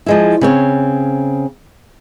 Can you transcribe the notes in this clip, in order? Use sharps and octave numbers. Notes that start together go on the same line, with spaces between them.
F3 G#3 E4
C#3 C4 C#5